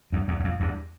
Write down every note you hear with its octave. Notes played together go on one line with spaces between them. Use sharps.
E2 G2
E2
E2
F2
E2 G2